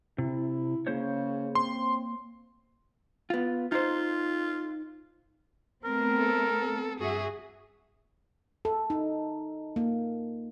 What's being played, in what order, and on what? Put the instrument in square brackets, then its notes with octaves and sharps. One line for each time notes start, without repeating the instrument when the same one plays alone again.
[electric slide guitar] C3 [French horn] E4
[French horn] C#3 [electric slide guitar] A#3 C5 C#5
[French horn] C4 [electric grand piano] C6
[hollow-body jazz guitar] B3 F4
[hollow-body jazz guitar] D#4 C5 [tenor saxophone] F4
[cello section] A3 B3 C4 [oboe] A#4
[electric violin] A4
[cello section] G2 F#4 E5 [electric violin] G#4
[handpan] A4
D#4
A#3